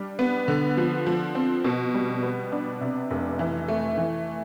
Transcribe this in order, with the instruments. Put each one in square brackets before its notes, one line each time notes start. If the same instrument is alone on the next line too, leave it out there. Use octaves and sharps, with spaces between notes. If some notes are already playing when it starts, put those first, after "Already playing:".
Already playing: [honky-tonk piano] G3 D4
B3
D3
F3
F3
C4
B2
G3
B3
D4
C3
F1
E3
A3
E3